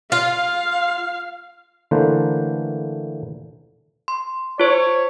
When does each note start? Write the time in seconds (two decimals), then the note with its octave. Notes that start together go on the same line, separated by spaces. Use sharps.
0.12 F4 F5
1.91 D3 E3 A3 A#3 B4 C5
4.08 C6
4.60 F4 C5 C#5